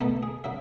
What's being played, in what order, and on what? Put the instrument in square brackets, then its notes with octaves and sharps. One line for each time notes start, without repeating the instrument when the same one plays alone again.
[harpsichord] C#2 B2 A3 A4
G#4
C#3 F#3 E5